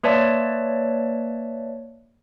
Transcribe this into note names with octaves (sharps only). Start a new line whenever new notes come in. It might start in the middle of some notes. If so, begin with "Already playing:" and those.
A#3 B4 C#5 D5 E5 A5